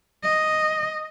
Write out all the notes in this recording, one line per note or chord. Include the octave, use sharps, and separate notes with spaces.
D#5